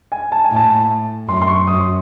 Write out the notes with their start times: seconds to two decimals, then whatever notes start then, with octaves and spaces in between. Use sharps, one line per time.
0.12 G#5
0.32 A5
0.44 G#5
0.51 A2 A5
1.29 F#2 C6
1.42 C6
1.48 C#6
1.67 F#2 D#6